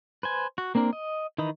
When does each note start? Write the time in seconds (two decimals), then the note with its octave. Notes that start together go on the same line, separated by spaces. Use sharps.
0.23 B4 C5 G#5
0.58 F#4
0.75 A#3 C4 D4 A#4
0.93 D#5
1.38 D#3 E3 D#4 D#5 B5